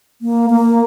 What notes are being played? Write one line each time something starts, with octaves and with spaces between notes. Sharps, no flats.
A#3
A#3